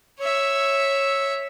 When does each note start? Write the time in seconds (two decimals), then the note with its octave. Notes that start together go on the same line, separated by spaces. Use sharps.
0.19 C#5 E5